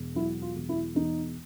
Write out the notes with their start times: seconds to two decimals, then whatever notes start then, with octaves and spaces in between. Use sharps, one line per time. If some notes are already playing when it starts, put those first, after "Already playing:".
Already playing: E1
0.15 F#3 E4
0.42 F4
0.55 E1
0.69 E4
0.95 E2 D#4